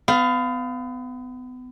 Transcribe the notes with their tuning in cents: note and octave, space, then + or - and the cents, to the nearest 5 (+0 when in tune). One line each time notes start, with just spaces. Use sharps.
B3 +35 F5 +0